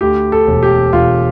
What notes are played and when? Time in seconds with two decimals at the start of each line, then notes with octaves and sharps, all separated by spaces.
0.01 D2 G4
0.32 A4
0.47 E1
0.63 G4
0.93 E1 F4